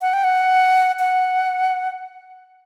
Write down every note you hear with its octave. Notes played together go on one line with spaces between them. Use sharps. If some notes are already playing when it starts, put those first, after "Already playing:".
F#5
G5
F#5
F#5